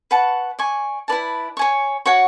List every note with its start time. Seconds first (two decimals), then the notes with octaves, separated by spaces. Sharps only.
0.11 B4 F#5 A5 C#6
0.59 D5 G#5 C#6
1.08 E4 B4 D5 A5
1.57 C#5 G#5 C#6
2.06 F#4 C#5 F#5 C#6